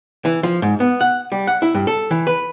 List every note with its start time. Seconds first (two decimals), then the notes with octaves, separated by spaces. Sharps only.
0.25 E3
0.43 F3
0.62 G#2
0.80 B3
1.01 F#5
1.32 G3
1.47 F#5
1.62 E4
1.74 G2
1.87 A4
2.11 E3
2.27 B4